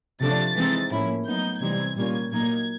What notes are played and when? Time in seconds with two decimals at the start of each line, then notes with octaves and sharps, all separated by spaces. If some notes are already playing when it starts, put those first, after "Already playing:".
0.21 C3 F3 A3 D4 A6
0.55 E3 G#3 C4 D#4
0.91 A2 F3 A#3 C#4 E4
1.25 A2 F#3 B3 D#4 G6
1.61 C3 E3 G3 C4 D#4 G#6
1.96 A#2 G3 A#3 C#4 F4
2.32 A#2 F#3 A#3 D#4 G#6